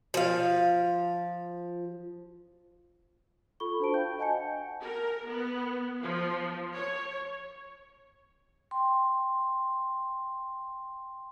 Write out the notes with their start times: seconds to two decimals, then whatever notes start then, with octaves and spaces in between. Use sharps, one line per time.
0.14 F3 F5
3.60 F4 A4 B5 C#6 G7
3.80 D4 F#4 C5 A5 D7
3.94 F5 G5 G6
4.19 D#5 F#5 G#5 A5 G6 C#7
4.82 A#4
5.27 B3
6.01 F3
6.73 C#5
8.71 G5 C6